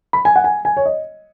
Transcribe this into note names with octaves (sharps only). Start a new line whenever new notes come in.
B5
G#5
F#5
G#5
G#5
C#5
D#5